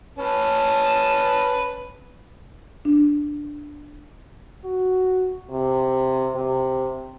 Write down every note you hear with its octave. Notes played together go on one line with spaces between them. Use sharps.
C#4 B4 A5
D4
F#4
C3
C3